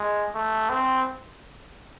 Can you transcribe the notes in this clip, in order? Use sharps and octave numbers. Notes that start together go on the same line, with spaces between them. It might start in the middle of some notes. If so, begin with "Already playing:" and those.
Already playing: G#3
A3
C4